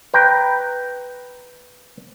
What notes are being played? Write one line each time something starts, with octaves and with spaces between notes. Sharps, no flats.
B4 G5 A#5